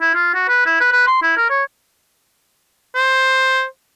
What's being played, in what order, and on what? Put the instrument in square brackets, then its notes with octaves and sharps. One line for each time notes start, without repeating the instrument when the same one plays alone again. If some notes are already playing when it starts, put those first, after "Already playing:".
[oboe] E4
F4
F#4
B4
E4
B4
B4
C6
E4
A#4
C#5
[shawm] C5